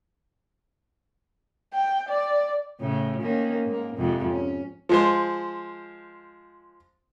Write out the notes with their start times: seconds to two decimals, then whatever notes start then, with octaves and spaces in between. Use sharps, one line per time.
1.73 G5
2.09 D5
2.80 A2 C#3
3.22 D#3 A#3 C#4
3.65 G#2 A#3
3.97 F2 G#2 C3
4.31 C#4
4.89 F3 G#3 C5